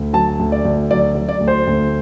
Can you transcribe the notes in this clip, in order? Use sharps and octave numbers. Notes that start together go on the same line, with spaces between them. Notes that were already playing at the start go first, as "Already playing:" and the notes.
Already playing: D2
F#3 A5
D2
D5
D2
F#3 D5
F#3
D5
D2
C5
D2